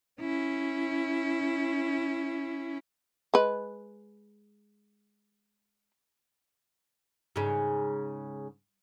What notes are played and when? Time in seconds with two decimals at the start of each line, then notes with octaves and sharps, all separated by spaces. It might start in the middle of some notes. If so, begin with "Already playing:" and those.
0.21 C#4 E4
3.34 G#3 B4
7.36 G#2 C#3